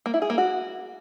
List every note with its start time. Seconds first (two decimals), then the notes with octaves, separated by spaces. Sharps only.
0.06 A#3
0.14 E4
0.22 G#4
0.30 A#3
0.38 F#4